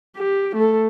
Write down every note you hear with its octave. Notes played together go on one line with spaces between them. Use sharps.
G4
A3 A4